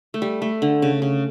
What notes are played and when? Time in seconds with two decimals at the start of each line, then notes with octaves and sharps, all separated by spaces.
0.14 A3
0.22 G3
0.42 A3
0.62 D3
0.82 C#3
1.02 C#3